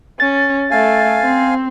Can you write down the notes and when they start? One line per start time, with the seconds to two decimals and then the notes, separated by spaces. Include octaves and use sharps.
0.20 C#4 A6
0.71 A3 F5 G#5
1.22 C4